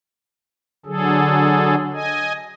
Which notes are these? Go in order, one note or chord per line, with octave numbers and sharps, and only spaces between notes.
D3 F#3 G#4 A4
D#5 G#5